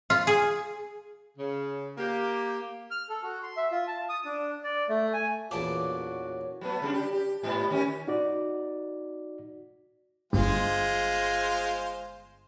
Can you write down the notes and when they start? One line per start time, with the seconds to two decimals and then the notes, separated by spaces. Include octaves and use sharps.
0.10 F4
0.27 G#4
1.38 C#3
1.98 A#3 G4
2.91 F6
3.09 A4
3.23 F#4
3.43 C6
3.57 E5
3.71 F4
3.87 A5
4.09 D#6
4.25 D4
4.64 D5
4.89 A3
5.13 G#5
5.51 A1 E2 A#2 F#4 C#5 D5 A5 D6
6.61 F#3 A3 B3
6.82 C#3 G3 D4
6.94 G4
7.13 G4
7.43 G#2 G3 B3
7.70 D#3 C#4 G4
8.08 D#4 F#4 D5
10.33 G1 G#3 F4 C5